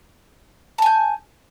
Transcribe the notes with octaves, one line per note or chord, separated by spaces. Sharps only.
G#5 A5 G6